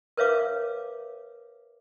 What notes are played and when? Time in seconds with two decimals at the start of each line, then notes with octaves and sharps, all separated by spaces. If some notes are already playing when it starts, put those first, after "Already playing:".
0.17 A#4 B4 C#5 E5 F5 D6